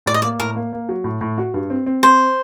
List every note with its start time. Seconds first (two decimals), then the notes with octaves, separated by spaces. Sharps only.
0.06 A2 D5
0.14 D#5
0.22 A#3 D5
0.39 A2 A#4
0.56 A#3
0.73 A#3
0.89 F#3
1.04 A2
1.21 A2
1.38 F#4
1.54 G2
1.70 C4
1.86 C4
2.03 C4 C5